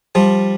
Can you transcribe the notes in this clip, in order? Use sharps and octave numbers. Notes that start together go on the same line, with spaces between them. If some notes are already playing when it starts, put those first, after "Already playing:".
F3 G3